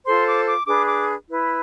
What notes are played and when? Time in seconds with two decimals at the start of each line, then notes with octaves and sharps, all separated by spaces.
0.05 F4 A4 C5 C6
0.26 D6
0.46 D6
0.66 D4 G#4 B4 D6
0.87 D6
1.28 E4 B4